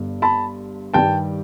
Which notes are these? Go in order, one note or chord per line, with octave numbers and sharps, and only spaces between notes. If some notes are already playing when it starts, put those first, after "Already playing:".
Already playing: G1 G2 D3
A5 B5
G2 D#3 G3 G5 A5